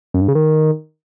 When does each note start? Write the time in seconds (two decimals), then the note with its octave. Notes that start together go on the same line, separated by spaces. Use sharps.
0.14 F#2
0.21 G2
0.28 C#3
0.35 D#3